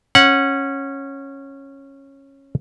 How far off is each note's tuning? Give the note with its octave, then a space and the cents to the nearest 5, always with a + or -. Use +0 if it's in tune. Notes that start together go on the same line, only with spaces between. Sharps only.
C#4 -15 F#5 -10